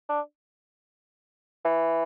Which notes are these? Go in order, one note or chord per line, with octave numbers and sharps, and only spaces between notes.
D4
E3